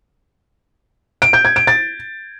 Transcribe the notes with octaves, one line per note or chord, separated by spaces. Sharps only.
D7
G6
G#6
D7
A6